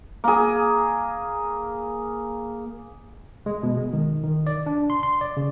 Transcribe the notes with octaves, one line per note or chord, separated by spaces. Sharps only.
A#3 G#4
G#3
B2
G#3
D#3
D#3
D5
D4
C6
C6
D5
C#3